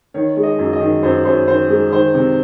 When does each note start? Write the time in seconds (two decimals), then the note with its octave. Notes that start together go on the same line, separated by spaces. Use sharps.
0.14 D#3 C#5
0.37 G#3
0.43 D#5
0.59 F#2
0.73 D#5
0.80 D#3
1.03 F#2 C5
1.25 F#2 C5
1.48 D#3 C5
1.70 G#3
1.92 D#3 C5
2.15 C3